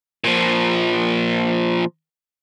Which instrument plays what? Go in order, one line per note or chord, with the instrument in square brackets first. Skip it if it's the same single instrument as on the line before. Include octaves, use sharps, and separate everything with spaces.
[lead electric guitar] A#2 F3